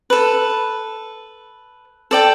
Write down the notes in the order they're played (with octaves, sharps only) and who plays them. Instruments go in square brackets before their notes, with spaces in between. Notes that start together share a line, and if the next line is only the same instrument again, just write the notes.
[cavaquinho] A4 B4
A4 D5 G5